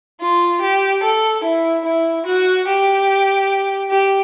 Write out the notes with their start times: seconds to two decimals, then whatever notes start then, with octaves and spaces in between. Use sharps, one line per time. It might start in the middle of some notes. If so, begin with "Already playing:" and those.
0.21 F4
0.62 G4
1.03 A4
1.44 E4
1.85 E4
2.26 F#4
2.67 G4
3.90 G4